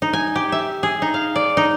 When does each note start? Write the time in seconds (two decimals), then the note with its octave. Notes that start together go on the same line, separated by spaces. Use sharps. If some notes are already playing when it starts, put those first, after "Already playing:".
0.02 D#4
0.13 G#5
0.36 G4
0.52 E5
0.83 G#4
1.02 D#4
1.14 F5
1.36 D5
1.57 D#4